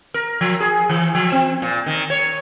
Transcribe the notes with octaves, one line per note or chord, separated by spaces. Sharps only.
A#4
F3
G#4
E3
F3
C4
A#2
D#3
C#5